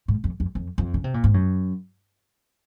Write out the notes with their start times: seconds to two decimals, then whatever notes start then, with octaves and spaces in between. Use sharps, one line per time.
0.08 G#2
0.24 F2
0.40 F2
0.55 F2
0.78 F2
0.94 C#3
1.04 C3
1.14 A#2
1.24 G#2
1.34 F#2